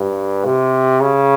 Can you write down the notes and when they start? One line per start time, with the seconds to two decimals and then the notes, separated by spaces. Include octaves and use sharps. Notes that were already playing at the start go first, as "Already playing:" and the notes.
Already playing: G2
0.45 C3
1.01 C#3